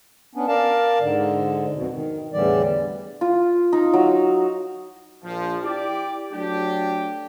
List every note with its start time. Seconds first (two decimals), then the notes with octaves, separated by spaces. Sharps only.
0.35 B3 C#4 D4
0.48 A#4 D5 F5 A5
1.00 G#2 D3
1.75 F2 B2
1.92 D#3
2.33 E2 A2 D3 E3 G3 D5
3.21 F4
3.73 D#4
3.93 F#3
5.23 A#1 F3
5.63 E4 G4 D5
6.32 F#3 A3 D4 G4